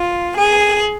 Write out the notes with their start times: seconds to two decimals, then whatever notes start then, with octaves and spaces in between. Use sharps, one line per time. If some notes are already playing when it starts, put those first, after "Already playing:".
Already playing: F4
0.38 G#4